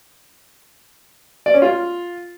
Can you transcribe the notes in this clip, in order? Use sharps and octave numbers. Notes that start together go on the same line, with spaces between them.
D5
C#4
F4